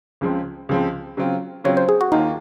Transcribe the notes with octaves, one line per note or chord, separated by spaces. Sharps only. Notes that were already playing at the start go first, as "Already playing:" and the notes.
C#2 C#3 F3 G#3 C4
C#2 C#3 F3 G#3 C4
C#3 F#3 C4 F4
C#3 F#3 C4 F4 C#5
C5
G#4
F#4
D#2 D#3 A#3 D#4 F4